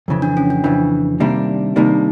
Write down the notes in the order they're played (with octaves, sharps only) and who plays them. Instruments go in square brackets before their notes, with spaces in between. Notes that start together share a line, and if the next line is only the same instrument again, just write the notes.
[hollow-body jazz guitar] F2 C#3 E3
[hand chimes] D4
C#4
D4
[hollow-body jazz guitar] F2 C#3 E3 [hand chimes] D4
[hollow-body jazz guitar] C3 D#3 G3 A#3 D4
[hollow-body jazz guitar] C3 D#3 G3 A#3 D4 [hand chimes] D#4